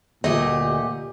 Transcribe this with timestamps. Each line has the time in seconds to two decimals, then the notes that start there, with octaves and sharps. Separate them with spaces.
0.24 D2 A#2 A3 G4 D#5